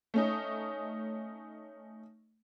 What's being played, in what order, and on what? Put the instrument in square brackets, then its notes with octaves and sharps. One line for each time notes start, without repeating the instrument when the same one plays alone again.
[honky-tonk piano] A3 C#4 D#4